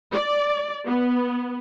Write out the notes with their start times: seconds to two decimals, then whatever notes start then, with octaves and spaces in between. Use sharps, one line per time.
0.12 D5
0.86 B3